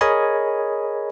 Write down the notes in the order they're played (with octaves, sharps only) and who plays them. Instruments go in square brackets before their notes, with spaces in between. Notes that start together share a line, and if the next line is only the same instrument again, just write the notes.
[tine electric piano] G#4 A#4 C#5 D#5 G#5 B5